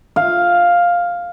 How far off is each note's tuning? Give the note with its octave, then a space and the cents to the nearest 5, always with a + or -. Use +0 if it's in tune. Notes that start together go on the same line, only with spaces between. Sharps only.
F5 +5